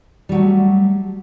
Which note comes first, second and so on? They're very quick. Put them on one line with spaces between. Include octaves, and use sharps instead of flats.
G3 F#3 A3